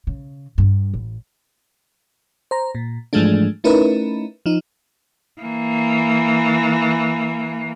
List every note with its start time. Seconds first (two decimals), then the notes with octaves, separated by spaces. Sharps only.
0.07 C#3
0.58 G2
0.94 A1
2.51 C5 A#5
2.75 A#2
3.13 G#2 E3 F3 G#3 A3 D4
3.64 A3 C#4 D#4 E4 A#4 B4
4.46 F3 D#4
5.41 E3 A#3